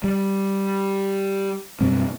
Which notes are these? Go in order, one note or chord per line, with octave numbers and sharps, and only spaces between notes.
G3
F#2 B2 G3 C4